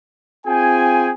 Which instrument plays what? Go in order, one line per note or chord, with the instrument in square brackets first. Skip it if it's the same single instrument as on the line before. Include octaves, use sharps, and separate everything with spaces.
[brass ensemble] C4 F4 G#4 G5 G#5